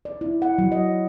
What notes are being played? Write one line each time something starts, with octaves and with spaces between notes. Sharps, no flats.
D5
E4
F#5
F#3
D#5